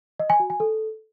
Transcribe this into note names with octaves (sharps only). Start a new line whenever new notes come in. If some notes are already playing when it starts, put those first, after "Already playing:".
D#5
G#5
F#4
G#5
A4